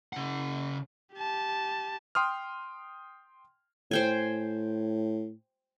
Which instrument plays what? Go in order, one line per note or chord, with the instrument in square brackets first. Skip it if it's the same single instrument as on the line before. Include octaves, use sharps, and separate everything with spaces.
[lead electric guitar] C#3 F#5
[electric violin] G4 A5
[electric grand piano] G5 C6 D#6 F6
[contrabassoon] A2 [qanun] C5 G5 G#5